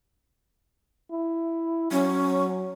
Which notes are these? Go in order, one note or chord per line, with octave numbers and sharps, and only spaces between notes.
E4
F#3 C#4